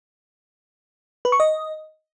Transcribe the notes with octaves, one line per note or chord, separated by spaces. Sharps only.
B4
C#6
D#5